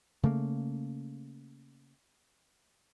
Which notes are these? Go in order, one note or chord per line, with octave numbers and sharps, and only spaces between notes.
C#3 A3 A#3